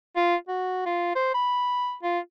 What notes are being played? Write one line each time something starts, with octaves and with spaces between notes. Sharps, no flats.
F4
F#4
F4
C5
B5
F4